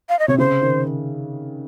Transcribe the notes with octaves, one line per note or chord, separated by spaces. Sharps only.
F5
D#5
C3 C#5
C#3 C5
D#3